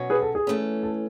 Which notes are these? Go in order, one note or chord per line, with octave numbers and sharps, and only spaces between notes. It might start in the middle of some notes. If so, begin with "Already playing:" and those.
Already playing: B2 F#3 C#4
G#4 B4
A4
G#4
E3 A3 C#4
A4